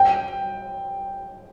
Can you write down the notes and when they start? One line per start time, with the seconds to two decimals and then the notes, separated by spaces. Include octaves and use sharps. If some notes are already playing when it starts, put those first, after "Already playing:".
Already playing: G5